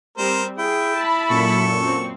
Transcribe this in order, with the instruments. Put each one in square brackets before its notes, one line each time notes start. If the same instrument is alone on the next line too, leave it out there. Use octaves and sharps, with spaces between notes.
[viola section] G3 C4 [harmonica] A#4 C5
[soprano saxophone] E4 [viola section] G#4 [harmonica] G5
[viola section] A5 B5
[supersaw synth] F#2 A#2 [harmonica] A4 C#6
[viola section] C4